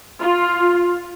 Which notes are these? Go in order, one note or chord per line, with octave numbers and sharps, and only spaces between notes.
F4